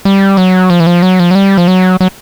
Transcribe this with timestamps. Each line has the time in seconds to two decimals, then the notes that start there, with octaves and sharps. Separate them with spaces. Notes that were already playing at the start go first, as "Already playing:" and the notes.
0.05 G3
0.37 F#3
0.70 F3
0.80 E3
0.87 F3
1.02 F#3
1.19 F3
1.31 F#3
1.35 G3
1.57 F3
1.68 F#3
2.01 F#3